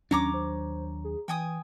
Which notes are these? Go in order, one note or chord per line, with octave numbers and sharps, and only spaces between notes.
D#2 F#3 C#4 D4 C#5 A#5 D6
C5
G#4
E3 G5 G#5 D#6